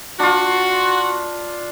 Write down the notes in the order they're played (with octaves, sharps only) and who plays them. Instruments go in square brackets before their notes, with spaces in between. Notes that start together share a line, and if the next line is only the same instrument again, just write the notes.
[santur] D4 F4 [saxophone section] F#4